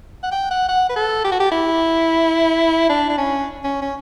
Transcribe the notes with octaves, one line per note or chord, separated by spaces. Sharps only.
F#5
G5
F#5
F#5
B4
A4
G4
F#4
G4
E4
D4
D4
C#4
C#4
C#4